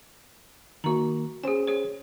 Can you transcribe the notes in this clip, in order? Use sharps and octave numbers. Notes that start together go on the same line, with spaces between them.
D#3 A#3 F#4 A#5
C#4 G#4 C5 G#5
G#4 C#5